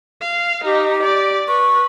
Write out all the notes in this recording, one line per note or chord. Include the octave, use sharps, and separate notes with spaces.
F5
D#4 G4
D5
B4 C#6